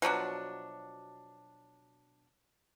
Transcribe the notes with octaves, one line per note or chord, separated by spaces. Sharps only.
B2 F3 F#3 D4